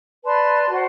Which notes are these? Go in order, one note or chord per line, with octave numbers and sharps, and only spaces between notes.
B4 D5 A5 C6
F#4 C5 F#5